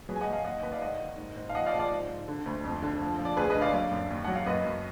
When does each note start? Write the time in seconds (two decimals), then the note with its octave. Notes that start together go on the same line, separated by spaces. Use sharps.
0.09 F#3 G#4 B4
0.16 G#5
0.21 D#5 F#5
0.27 F#3
0.33 F5 G#5
0.44 D#2 D#5 F#5
0.63 D#2 B4 D#5
0.72 D5 F5
0.82 G#2 D#5 F#5
1.00 D#3
1.18 G#2
1.37 G#2
1.49 F5
1.54 F3 D#5 F#5
1.66 D5 F5
1.73 F3
1.79 D5 F5
1.91 G#2
2.09 G#2
2.28 D3
2.46 D2
2.64 F2
2.82 D3
3.01 F3
3.18 F3
3.25 D5
3.37 D2 G#4 B4
3.50 B4 D#5
3.55 D3
3.61 D5 F5
3.73 F#3 D5 F5
3.91 F#2
4.10 D#2
4.24 F#3 F#5
4.35 F5
4.46 F#2 B4 D#5
4.65 F#2